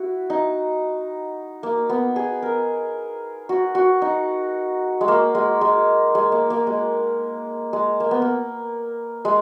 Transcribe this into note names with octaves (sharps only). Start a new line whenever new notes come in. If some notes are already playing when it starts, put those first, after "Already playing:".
Already playing: E4 F#4
D#4
A#3
B3
G#4
A#4
F#4
F#4
D#4
G#3
A#3
G#3
G#3
G#3
A#3
A#3
G#3
G#3
A#3
B3
A#3
G#3